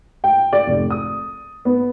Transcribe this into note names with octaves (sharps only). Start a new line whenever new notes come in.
G5
D5
F1
D#6
B3